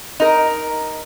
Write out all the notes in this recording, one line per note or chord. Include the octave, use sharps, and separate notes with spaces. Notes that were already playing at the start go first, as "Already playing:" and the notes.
D#4 A#4